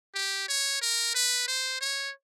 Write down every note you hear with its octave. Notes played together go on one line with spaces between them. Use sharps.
G4
C#5
A#4
B4
C5
C#5